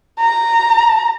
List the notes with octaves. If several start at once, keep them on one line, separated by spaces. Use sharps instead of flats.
A#5